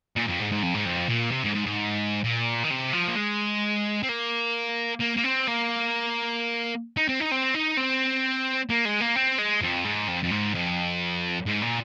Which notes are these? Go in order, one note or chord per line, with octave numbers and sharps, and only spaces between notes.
A#2
F2
G#2
G#2
F2
G#2
F2
A#2
C3
G#2
G#2
G#2
A#2
D#3
C3
F3
A#3
G#3
C4
A#3
A#3
A#3
C4
A#3
D#4
C4
D#4
C4
D#4
C4
A#3
G#3
A#3
C4
G#3
F2
G#2
F2
F2
G#2
F2
G#2
A#2